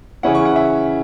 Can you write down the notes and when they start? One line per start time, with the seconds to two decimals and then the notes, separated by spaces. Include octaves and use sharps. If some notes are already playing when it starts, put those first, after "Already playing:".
0.23 C#3 E3 C#4 E4 F#5
0.35 C#6
0.45 F#5
0.56 E5